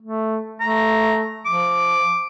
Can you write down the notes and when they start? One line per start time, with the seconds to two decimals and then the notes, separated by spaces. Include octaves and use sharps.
0.02 A3
0.60 A3 A#5
1.45 F3 D6